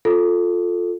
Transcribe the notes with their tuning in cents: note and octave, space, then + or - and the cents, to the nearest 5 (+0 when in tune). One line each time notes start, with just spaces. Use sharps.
F4 +15 A4 +0